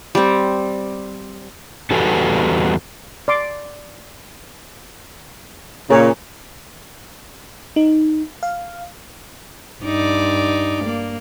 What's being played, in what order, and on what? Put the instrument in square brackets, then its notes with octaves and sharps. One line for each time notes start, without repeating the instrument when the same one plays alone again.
[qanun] G3 C4
[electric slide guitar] E2 G3 F#4 A4 B4 G#5
[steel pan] D5 C6 D6
[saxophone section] A#2 C#3 [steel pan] G#4 A#4 C#5
[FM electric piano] D#4
F5
[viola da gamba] G2 D#4 D5
A#3